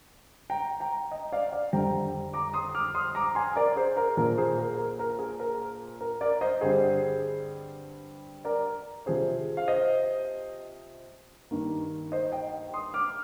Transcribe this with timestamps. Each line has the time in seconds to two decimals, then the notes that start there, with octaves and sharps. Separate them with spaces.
0.50 G5 A#5
0.80 G5 A#5
1.11 D#5 G5
1.32 D5 F5
1.52 D5 F5
1.72 F2 D3 G3 C4 G5 A#5
2.34 A#5 D6
2.54 C6 D#6
2.75 D6 F6
2.95 C6 D#6
3.15 A#5 D6
3.35 G#5 C6
3.56 A#4 D5
3.76 G#4 C5
3.97 A#4
4.17 A#2 F3 A#3 A#4
4.38 G#4 C5
4.58 A#4
4.78 A#4
4.99 A#4
5.19 G#4
5.40 A#4
6.01 A#4
6.21 A#4 D5
6.41 C5 D#5
6.61 G2 D3 G3 C4 G#4 C5
8.45 A#4 D5
9.06 C3 F3 C4 G#4 C5
9.57 F5
9.68 C5 D#5
11.51 G2 D#3 A#3
12.12 C5 D#5
12.32 D#5 G5
12.74 C6 D#6
12.94 D6 F6